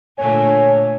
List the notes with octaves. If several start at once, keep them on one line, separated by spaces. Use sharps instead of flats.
A#2 D3 A3 C#5 G#5